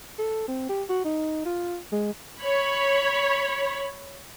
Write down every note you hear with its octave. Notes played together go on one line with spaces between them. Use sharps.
A4
C4
G4
F#4
D#4
F4
G#3
C#5 B5